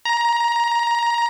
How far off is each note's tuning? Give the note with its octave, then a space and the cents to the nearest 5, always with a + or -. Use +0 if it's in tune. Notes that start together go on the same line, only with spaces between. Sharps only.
A#5 +15